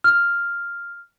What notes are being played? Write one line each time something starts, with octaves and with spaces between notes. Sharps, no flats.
F6